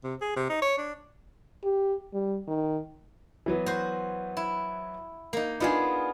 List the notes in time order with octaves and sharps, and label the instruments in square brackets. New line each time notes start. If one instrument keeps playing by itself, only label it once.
[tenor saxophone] C3
G#4
C3
D#4
C#5
D4
[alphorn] G4
G3
D#3
[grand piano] E3 F#3 B3
[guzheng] F#4 C5
E4
A#3 D#4
[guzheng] B3 D4 G#4 [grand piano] D#4 F4